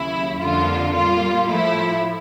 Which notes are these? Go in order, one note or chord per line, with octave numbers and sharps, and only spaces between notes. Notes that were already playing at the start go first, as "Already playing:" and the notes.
Already playing: D#2 C#3 F#3 E4
F2 D3 G3 A#3 F4
A#2 G3 A#3 F4
A2 F3 A3 E4